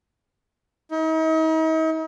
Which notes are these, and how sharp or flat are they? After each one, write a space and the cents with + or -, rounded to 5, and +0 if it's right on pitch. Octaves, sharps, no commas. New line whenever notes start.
D#4 +40